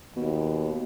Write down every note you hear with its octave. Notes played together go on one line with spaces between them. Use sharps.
D#2 B2